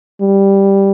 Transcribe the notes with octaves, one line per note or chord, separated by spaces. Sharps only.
G3